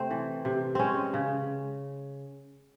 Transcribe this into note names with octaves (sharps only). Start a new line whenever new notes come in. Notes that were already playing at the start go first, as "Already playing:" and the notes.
Already playing: C3 A3 C4
E3
C3
G#3 C4 C#4
C#3